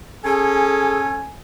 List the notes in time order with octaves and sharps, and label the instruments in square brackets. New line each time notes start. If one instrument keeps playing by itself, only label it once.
[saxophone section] C#4 A4 [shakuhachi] G#4 [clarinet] G#5